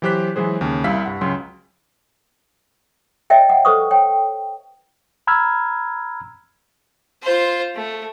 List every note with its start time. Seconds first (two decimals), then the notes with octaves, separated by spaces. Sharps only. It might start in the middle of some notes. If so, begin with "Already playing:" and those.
0.02 E3 F#3 G4 C5 F#6 B6
0.36 E3 F#3 G#3 G#4 C5
0.61 D#2 C#3
0.84 C2 G3 E4 F5 E6 B6
1.05 G2 F#5
1.21 C#2 C#3 F#3 C6
3.30 C#5 D#5 E5 G5
3.49 F#5
3.65 A4 B4 C5 C#6 D#6
3.91 C#5 G5
5.27 A#5 B5 E6 F6 G#6
7.22 F4 C5
7.75 A3